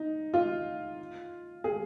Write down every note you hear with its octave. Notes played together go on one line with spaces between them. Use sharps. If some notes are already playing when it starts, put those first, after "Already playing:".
Already playing: D#4
F4
G#4